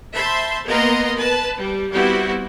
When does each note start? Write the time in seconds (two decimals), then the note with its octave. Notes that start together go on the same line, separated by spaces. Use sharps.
0.15 C5 E5 A5 B5 C6
0.66 A#3 B3 A#4 D#5 A#5 C6
1.17 B4 A5
1.60 G3
1.92 G3 B3 C4 E4 F#4